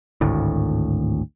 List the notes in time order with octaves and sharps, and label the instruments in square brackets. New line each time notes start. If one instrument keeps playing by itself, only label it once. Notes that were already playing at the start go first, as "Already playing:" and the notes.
[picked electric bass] G#1 D2 A2